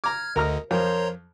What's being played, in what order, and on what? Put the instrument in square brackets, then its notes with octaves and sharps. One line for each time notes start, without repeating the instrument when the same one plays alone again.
[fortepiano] A#5 D6 [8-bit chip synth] F6 G#6
[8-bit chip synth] D2 D3 [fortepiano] A#4 A#5 F6 [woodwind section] D#5
[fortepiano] F2 [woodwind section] A#4 C5 [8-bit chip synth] C#5 A#5 C6